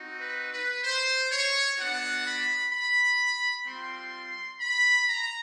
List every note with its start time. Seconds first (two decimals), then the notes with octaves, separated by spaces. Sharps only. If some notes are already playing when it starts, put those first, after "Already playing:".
Already playing: C4 D#4 F#4
0.20 B4
0.53 B4
0.84 C5
1.30 C#5
1.77 B3 D4 F#4 F#5
2.25 B5
2.72 B5
3.66 G3 C4 F4 C6
4.60 B5
5.08 A#5